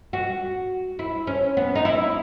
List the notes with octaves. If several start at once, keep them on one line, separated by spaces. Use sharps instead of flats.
F#4
E4
C#4
B3
D#4
E4